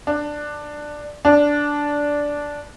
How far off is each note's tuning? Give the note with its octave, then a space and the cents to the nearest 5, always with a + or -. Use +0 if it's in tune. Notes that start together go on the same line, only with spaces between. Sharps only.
D4 +10
D4 -10